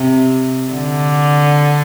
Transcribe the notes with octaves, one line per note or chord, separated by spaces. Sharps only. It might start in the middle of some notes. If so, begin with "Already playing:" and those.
Already playing: C3
D3